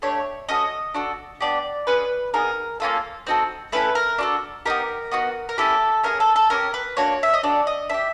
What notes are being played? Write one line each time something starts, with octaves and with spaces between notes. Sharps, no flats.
A3 D4 G4 C#5
C#4 F#4 A4 D#5
D4 F#4 A4
B3 D4 G4 D5
C#4 F4 G#4 B4
B3 D#4 G#4 A#4
A#3 C#4 F4 A4
C4 D#4 F#4 A4
A3 C#4 E4 A4 B4
A#4
D4 F#4 A4
B3 D#4 G4 A#4
B3 D#4 F#4
A#4
C#4 E4 G4 A4
C#4 F4 G#4 A#4
A4
A4
C#4 E4 G4 A#4
B4
A#3 D4 F#4 C#5
E5
D#5
D4 F#4 A4 D5
D#5
D4 G4 E5